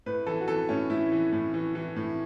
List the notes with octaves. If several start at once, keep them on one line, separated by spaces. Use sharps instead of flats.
A2 B4
E3 A4
F#4
E3 A4
A2 C#4
A2 E4
E3
A2
E3
E3
A2